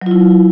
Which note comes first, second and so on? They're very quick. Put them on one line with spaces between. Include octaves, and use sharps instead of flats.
F#3 F4 E4